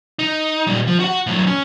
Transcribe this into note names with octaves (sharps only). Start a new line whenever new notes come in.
D#4
A#2 G3
F3
F#4 F#5
A2 F#3
C#4